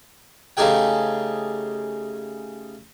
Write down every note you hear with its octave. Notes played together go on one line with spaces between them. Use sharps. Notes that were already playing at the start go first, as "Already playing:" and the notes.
C#3 A3 D#4 G4 G#4 G5